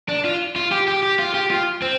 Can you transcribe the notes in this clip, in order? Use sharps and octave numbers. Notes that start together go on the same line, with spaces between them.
D4
F4
F4
G4
G4
G4
F4
G4
F4
C4